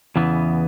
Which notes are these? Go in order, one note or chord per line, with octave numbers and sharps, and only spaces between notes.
E2 C#3 E3 B3